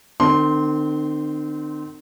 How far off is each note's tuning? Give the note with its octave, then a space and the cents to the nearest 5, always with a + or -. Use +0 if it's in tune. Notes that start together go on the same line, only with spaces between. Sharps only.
D#3 -45 C4 -20 C6 +0